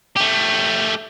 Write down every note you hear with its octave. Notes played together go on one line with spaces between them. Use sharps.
A3 G4